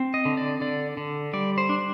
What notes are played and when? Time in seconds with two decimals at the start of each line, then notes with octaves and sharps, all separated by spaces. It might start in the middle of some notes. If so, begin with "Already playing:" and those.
Already playing: C4
0.14 D#5
0.25 D3
0.37 D5
0.61 D3 D5
0.97 D3
1.33 G3 D5
1.58 C5
1.69 D4